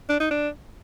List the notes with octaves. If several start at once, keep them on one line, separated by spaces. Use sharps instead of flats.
D4
D#4
D4